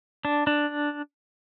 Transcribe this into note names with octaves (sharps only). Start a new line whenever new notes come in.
D4
D4